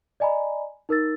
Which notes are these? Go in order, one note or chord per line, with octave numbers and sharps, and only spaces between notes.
D5 D#5 G#5 A#5 B5
D#4 A#4 E6 A6